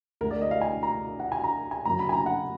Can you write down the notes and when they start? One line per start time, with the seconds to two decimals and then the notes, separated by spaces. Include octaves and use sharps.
0.21 D2 D3 G#3 A#4
0.31 D5
0.41 D#5
0.51 F5
0.61 G#5
0.83 A#5
1.20 F#5
1.32 G#5
1.44 A#5
1.71 G#5
1.85 F#1 F#2 D3 F#3 A#3 A#5
1.99 B5
2.09 G#5
2.13 A#5
2.26 F#5